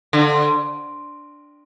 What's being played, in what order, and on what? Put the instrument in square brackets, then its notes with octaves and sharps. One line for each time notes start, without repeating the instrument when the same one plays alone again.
[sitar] D3